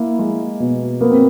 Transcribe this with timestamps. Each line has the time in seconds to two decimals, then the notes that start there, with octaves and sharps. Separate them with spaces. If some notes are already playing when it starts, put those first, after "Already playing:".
Already playing: A#3 E4
0.19 G#3
0.60 B2
1.01 A#3 B3
1.11 C4